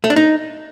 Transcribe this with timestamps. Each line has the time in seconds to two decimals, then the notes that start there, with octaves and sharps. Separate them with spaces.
0.04 A3
0.10 D4
0.16 D#4